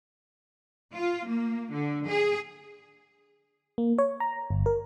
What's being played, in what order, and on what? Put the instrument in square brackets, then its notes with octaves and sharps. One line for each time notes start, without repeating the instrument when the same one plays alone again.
[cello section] F4
A#3
D3
G#4
[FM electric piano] A#3
C#5
A#5
G1
A#4